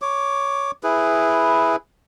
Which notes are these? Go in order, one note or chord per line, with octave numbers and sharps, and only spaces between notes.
C#5 D6
E4 G#4 B4